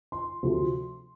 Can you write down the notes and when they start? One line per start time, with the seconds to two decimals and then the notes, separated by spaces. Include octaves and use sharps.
0.12 C6
0.43 D2 C3 F3 A3